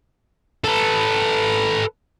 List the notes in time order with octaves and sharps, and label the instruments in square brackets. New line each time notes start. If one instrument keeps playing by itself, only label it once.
[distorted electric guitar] A4 B4